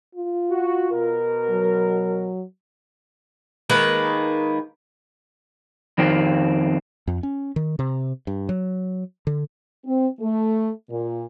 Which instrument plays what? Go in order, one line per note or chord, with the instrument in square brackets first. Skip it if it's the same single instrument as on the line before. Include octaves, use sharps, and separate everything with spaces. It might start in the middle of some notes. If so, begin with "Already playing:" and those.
[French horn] F4
[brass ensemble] F#4
B2 A#4
[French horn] F#3
[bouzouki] D#3 G#3 A#3 B4
[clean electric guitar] F2 D#3 C4
[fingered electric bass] F2
C#4
D#3
C3
G2
F#3
D3
[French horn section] C4
A3
A#2